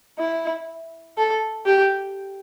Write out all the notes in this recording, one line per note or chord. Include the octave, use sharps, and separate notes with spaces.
E4
A4
G4